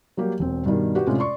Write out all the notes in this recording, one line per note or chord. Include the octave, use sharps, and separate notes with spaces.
F#3 G3 A#3 G4
E1 C4
G2 B2 D#3 G3
F#4 G4 B4 F#5
A2 C3 G#3 C#4 F4
D5 C6 C#6